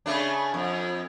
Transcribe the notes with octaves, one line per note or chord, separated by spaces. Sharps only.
C#3 A3 D4
F2